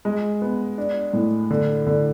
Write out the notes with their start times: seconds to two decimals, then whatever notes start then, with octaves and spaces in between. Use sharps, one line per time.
0.05 G#3
0.42 B3
0.78 D4
1.13 A2
1.51 D3
1.86 D3